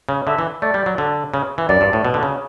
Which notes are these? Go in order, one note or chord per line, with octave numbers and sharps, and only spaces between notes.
C#3
D3 E5
E3
A3 D5
G3
F#3
D3
C#3
E3
F#2 D5
G2
A2
B2
D3
C#3